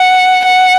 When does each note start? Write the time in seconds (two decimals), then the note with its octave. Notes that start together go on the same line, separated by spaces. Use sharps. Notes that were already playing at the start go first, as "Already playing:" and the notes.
Already playing: F#5
0.45 F#5